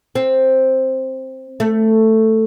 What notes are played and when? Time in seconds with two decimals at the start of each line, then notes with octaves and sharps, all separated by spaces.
0.15 C4
1.60 A3